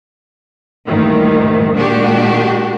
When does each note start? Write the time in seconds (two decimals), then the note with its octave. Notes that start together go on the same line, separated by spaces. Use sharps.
0.86 D2 G2 A#2 D#3 E3
1.76 A#2 D#3 G#3 D4 F#4 G4